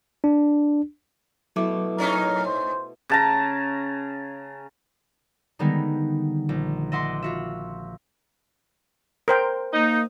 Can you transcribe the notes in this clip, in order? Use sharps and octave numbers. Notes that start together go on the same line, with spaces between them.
D4
B2 F#3 A3 E4 D6
A2 C#4 D#4 A#4
C5
C#3 A5 A#5
D3 D#3 G3 G#3 B3 D#4
A#1
D#5 E5 F#5 C6 D6
F4 F#4 E5
A#4 C5 G5
A#3 D#4